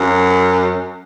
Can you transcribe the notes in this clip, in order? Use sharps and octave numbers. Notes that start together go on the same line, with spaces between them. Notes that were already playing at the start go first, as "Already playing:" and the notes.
Already playing: F#2